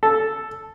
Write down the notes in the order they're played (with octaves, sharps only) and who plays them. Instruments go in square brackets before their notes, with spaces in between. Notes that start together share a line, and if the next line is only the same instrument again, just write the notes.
[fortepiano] A4